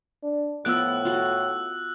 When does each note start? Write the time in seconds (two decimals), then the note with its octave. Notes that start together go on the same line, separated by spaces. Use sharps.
0.23 D4
0.65 A2 F3 B3 D6 E6 F#6
1.05 F4 F#4